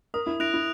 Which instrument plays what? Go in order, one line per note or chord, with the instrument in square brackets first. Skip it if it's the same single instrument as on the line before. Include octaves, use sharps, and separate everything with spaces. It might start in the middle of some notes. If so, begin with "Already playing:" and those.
[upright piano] A#4 [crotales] D#6
[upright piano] E4
[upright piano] E4 [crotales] F#6 A#6 D7 F7
[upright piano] E4